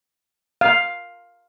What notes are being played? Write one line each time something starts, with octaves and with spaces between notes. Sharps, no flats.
F5